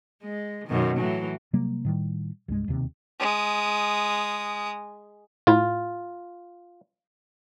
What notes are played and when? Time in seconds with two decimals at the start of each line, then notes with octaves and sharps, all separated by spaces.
0.23 G#3
0.68 F#2 B2 D#3
0.98 A2 E3 F#3
1.53 C3 F#3 G3 A#3
1.85 A2 D#3 G3
2.48 C2 G2 G#3
2.68 E1 D#2 C3
3.20 G#3 D#6
5.47 A2 E4 F4